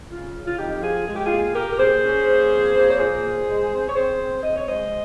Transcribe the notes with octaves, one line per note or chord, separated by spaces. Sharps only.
C#3 F4
C#3
F4
F2 D#4 G4
F3 F4 G#4
G#3 G#4
G4
F4 G#4
A#2
A#2 G4 A#4
A#4
A#2 G#4 C5
C#4
A#3
F2
A#3
C#5
A#2 G#4 C5
A#2
G#3
C4
C#5
C4 G#4 C5
C4
C4 D#5
C#5
G#3 C5 D#5